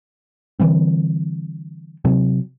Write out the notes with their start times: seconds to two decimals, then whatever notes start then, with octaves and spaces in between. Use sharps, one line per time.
0.59 D3 E3 G3 C4
2.05 C3 F#3 C4